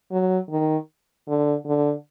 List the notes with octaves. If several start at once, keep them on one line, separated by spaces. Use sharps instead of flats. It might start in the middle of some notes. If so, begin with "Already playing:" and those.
F#3
D#3
D3
D3